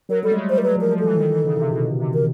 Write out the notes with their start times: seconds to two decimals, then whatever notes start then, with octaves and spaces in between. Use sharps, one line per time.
0.09 F#3 A#4
0.23 G3 A4
0.31 G#3
0.37 A3
0.49 G3 C5
0.58 A#4
0.63 F#3 B4
0.76 F3
0.81 A#4
0.91 F3
0.99 E3 A4
1.17 D#3
1.30 E3
1.44 C#3
1.57 C3
1.71 B2
1.98 C3
2.14 A#4